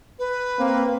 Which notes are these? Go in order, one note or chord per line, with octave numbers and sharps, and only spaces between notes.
B4
A#3 C4